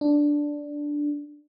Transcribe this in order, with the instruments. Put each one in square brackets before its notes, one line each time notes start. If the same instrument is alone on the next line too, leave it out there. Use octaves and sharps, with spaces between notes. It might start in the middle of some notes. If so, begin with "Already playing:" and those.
[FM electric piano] D4